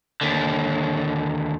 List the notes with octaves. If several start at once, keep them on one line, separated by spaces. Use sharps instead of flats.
D#2 D3